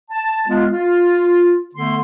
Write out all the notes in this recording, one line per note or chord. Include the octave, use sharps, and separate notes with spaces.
A5
G#3 B3 F4
F4
D3 A3 B3 C6